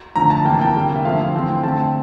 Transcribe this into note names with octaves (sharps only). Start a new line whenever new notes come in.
D3 F3 A3 A#5
A5
C3 E3 A#3 G5
A5
G5
D3 G3 A#3
E5
D3 F3 A3 C4 F5
E3 A3 C4
G5
D3 A3 C4 A5